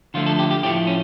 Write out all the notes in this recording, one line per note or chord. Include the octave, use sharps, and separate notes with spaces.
D3 F3 A3 F4
A4
G4
G4
A2 F3 A3 G4
C#4